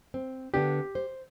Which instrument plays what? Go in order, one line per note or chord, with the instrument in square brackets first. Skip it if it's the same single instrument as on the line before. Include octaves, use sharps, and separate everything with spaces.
[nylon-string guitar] C4
[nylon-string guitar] D3 B3 D4 [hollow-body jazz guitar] G4
[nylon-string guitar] C5